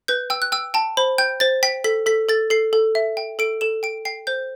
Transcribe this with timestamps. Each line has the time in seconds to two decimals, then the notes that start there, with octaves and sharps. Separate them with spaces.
0.08 B4 G6
0.30 G5 E6
0.42 F#6
0.52 G5 E6
0.74 G5 A5
0.97 C5 B5
1.18 G5 G6
1.40 C5 A6
1.63 G5 B6
1.84 A4 B6
2.06 A4 B6
2.29 A4 A6
2.50 A4 C7
2.73 A4
2.95 E5
3.17 G5
3.39 A4 D7
3.61 A4 E7
3.83 G5 D7
4.05 G5 C7
4.27 C5 G6